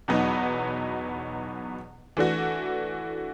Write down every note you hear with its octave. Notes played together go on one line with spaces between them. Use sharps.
E2 B2 F#3 B3 D#4
E3 A3 D4 F#4